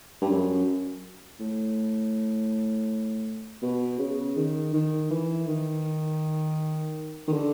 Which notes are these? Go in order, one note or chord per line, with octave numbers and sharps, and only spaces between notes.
G2
F#2
A2
B2
C#3
D#3
D#3
E3
D#3
D#3
D3